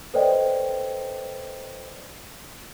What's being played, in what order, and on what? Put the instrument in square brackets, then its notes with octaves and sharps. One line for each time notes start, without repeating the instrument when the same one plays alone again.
[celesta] A4 B4 C5 D5 D#5 G5